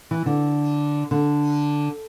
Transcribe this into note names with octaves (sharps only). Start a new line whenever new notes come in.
E3
D3
D3